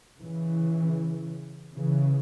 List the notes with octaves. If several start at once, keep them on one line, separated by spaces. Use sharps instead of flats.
C#3 E3
C#3 E3